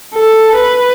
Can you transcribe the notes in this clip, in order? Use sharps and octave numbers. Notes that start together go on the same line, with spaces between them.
A4
B4